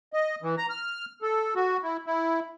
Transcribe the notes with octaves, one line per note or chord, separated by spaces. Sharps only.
D#5
E3
A#5
F6
A4
F#4
E4
E4